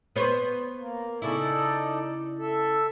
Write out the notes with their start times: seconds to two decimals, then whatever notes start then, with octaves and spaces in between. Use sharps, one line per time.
0.16 B3 C5 C#5
0.79 A#3
1.22 C#3 D#4 E4 A4 D5
2.39 A4 E5